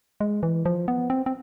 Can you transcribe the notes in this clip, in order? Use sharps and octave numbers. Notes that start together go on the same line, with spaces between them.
G#3
E3
F3
B3
C4
C4